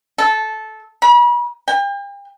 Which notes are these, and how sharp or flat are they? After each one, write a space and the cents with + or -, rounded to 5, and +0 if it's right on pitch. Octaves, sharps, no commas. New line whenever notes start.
A4 -15
B5 -40
G5 +40